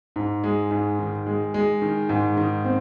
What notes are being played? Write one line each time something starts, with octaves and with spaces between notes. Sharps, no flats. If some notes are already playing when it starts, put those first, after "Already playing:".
G#2
G#3
G#2
D#3
G#3
G#3
D#3
G#2
D#3
C4